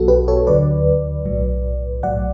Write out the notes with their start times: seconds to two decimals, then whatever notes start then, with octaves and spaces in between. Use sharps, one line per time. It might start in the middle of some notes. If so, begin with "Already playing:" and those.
Already playing: B1 B2 F#3 B3 F#4 A4
0.08 G4 B4
0.28 A4 C#5
0.47 D2 D3 F#3 B4 D5
1.25 B1 A2 F#3
2.03 B1 A2 F#3 D5 F#5